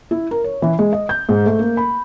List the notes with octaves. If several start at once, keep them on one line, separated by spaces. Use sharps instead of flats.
E4
A#4
C#5
E3
G#3
D#5
G6
G#2
A3
A#3
B5